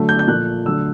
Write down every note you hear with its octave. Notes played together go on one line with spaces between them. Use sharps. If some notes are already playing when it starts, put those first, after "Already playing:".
Already playing: D3 F#3 A3
G6
G6
A#2 F3 A3 F#6
D3 F#3 A3 E6